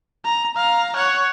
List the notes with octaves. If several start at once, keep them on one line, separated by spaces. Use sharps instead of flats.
A#5
F5 A#5
C#5 F#5